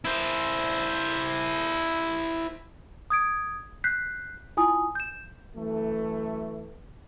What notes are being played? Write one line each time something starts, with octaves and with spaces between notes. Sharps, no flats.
E4 C5
D#6 G#6 D7
F#6 G6 B6 C7
E4 F4 G#5 D#6
G6 E7
F#2 E3 A3